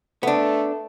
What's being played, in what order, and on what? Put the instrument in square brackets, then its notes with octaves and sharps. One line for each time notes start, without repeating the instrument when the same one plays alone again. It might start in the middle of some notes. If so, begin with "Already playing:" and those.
[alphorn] A3 [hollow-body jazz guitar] B3 D4